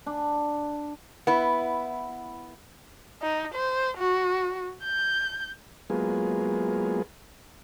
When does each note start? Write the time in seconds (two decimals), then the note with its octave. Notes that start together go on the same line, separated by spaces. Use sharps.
0.06 D4
1.27 B3 E4
3.22 D#4
3.55 C5
3.98 F#4
4.83 G6
5.90 F#3 G#3 A#3 B3 F4 G#4